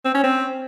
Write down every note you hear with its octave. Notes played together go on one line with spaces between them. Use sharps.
C4
C#4
C4